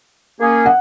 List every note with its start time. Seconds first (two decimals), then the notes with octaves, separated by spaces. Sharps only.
0.39 A#3 C#4 G#4
0.66 F#5